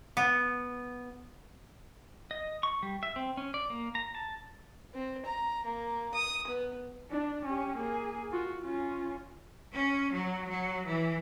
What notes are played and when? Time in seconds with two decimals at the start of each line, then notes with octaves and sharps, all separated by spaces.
0.17 B3
2.31 D#5
2.63 C#6
2.83 G3
3.03 E5
3.16 C4
3.37 C#4
3.54 D5
3.70 A#3
3.95 A#5
4.15 A5
4.94 C4
5.26 A#5
5.65 A#3
6.14 D#6
6.47 B3
7.11 D4
7.45 C#4 G4
7.77 A#3 G#4
8.31 F4 F#4
8.61 C#4 F4
9.74 C#4
10.13 F#3
10.47 F#3
10.86 E3